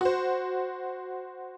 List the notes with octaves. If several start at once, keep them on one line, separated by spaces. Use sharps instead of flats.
F#4 C5